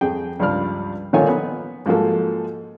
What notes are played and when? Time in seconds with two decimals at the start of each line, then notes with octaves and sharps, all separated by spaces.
0.01 F2 G#4 G5
0.39 C#2 G2 F3 G3 D5 F6
1.13 A#2 D3 D#3 F4 C#5 G#5
1.29 B3
1.86 G#2 F3 A#3 F#4 A4